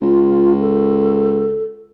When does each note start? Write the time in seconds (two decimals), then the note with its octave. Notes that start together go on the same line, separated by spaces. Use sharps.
0.01 C#2 F4
0.60 A4